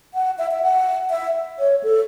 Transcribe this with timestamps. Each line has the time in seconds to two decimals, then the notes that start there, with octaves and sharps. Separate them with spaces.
0.14 F#5
0.38 E5
0.51 E5
0.63 F#5
1.10 E5
1.59 C#5
1.83 A4